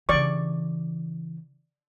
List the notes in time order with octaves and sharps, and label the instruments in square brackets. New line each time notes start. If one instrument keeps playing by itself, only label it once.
[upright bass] C#3 E3 [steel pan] D5 C#6